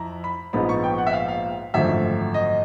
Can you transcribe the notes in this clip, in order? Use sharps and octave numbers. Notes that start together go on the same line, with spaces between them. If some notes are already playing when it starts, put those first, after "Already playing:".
Already playing: F2 E4 A#5
B5
A#1 G#2 F3 G#3 B3 B5
C#6
G5
F#5
E5
F5
F5
G#1 F#2 D3 F3 A3 E5
D#5